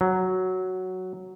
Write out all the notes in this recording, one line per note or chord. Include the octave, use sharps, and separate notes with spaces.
F#3